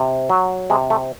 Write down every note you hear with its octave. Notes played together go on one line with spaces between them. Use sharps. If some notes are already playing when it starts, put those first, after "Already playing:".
Already playing: C3
F#3
C3 G#3
A3